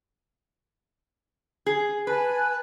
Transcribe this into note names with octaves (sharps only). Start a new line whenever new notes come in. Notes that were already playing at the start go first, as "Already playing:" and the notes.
G#4
B4 G#5 A5 F#6